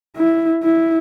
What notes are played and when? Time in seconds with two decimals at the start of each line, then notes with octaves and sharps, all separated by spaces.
0.17 E4
0.63 E4